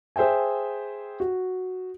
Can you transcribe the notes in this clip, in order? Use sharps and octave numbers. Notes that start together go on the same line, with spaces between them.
G#4 C5 E5 G5 G#5
F#4